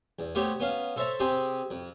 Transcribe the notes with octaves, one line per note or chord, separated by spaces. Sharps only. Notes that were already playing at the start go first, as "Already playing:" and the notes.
E2
A3 B3 G4 C5 C#5
B3 C#4 F5
A4 C5 C#5 E5 A5 A#5
C3 C4 G4 G#4 C5
F2